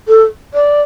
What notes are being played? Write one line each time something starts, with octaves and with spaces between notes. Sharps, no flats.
A4
D5